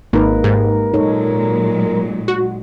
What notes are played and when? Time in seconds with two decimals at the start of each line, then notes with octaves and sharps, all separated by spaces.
0.13 G#1 A#3 D#4 A#4 B4
0.44 G#2 G4
0.94 A#2 F#3 G#3 D#4 A4 C#5
2.28 F#4